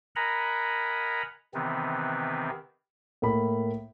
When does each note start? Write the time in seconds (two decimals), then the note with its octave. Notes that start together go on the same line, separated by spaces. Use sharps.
0.16 A#4 D#5 F#5 G#5 A#5 B5
1.54 C3 D#3 E3 B3 C4
3.22 A2 A#3 B5